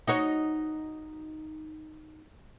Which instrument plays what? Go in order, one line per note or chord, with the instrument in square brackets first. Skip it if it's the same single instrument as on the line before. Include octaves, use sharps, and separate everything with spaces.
[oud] D#4 F#4 C#5